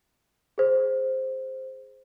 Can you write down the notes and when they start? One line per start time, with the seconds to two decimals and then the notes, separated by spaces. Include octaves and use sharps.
0.58 G#4 C5